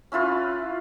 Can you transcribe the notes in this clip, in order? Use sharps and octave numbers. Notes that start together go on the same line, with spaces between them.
C#4 E4 F4 B4